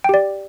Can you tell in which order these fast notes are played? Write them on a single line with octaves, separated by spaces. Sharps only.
G5 G4 D5